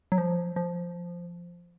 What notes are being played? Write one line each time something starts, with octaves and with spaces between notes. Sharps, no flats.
F#3
F3
F3